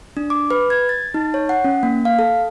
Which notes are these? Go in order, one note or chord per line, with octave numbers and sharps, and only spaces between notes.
D4
D6
B4
G#6
A6
D#4
C#5
F#5
C#4
A#3
F5
A4